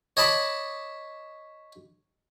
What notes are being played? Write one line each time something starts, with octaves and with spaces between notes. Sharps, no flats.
C#5 D#5 A5 B5 D6